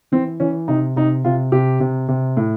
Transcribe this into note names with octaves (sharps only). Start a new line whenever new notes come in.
E3 C4
E3 C#4
C3 D#4
C3 D#4
C3 F4
C3 G4
C3
C3
A2